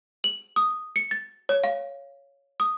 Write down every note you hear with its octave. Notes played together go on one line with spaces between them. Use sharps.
F#7
D#6
C#7
A6
C#5
F5
D#6